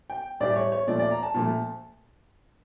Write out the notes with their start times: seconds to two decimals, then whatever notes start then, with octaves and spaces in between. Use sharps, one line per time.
0.10 G5
0.40 A2 E3 G3 D5
0.56 C#5
0.72 C#5
0.87 A#2 F3 A3 D5
0.99 D5
1.11 A#5
1.23 A5
1.34 A#2 F3 A3